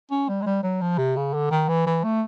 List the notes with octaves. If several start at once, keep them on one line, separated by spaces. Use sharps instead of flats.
C#4
G3
G#3
G3
F#3
F3
C3
C#3
D3
D#3
E3
E3
A3